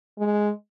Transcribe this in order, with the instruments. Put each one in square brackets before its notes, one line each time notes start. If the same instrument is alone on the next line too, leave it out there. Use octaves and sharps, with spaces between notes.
[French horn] G#3